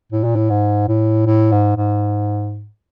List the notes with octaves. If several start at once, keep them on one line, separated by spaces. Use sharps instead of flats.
A2
A#2
A2
G#2
A2
A2
G#2
G#2